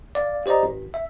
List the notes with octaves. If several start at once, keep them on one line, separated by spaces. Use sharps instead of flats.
D5 F5
G4 C5 D5 D#5 A#5
G#1
E5